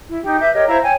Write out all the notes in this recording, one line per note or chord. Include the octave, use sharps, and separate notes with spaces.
E4
D#4 G4 G5
B4 E5 D6 G6
G4 A#4 C#5 D#5
E4 C5 F5 A#5
C#5 G5 G#5